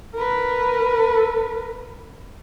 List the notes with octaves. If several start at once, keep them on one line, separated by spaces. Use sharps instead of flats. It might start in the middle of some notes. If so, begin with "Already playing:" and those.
A#4 B4